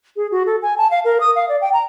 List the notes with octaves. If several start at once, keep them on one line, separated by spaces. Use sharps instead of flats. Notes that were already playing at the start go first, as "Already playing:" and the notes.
G#4
F#4
A4
G#5
A5
F5
A#4
D#6
F5
D5
G5
A#5